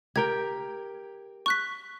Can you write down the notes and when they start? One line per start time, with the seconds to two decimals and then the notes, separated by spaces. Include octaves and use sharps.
0.16 G4 A#4 G5 G#6
1.46 C#6 F#6 B6